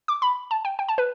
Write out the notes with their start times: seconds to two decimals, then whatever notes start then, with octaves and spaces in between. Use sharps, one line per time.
0.08 D6
0.22 B5
0.51 A5
0.65 G5
0.79 G5
0.89 A5
0.98 B4